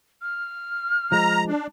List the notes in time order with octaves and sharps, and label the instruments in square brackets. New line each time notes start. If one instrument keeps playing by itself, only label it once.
[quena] F6
[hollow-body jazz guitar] F3 G#3 [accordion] A#5
[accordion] D4